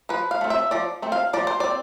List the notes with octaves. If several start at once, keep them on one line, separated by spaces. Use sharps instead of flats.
F3 B4
F5
A3 C4
E5
F3 D5
A3 C4
F5
F3 D5
C5
C4 D5